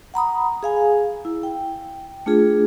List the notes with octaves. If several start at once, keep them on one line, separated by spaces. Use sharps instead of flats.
F#5 A#5 B5 D#6
G#4 F5 G#5
E4
G5
A3 D4 F4 G#4